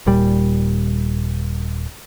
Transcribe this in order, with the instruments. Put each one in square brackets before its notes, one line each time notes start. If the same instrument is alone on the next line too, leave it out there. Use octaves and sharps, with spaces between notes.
[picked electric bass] D#1 A#2 G3